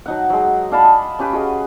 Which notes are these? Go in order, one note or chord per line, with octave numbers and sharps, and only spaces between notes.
F#3 D#4 F#5
F#3 G#3
D4 F5 A5 B5
D#5
C#4 G4 B4
F#4 G#4 D#5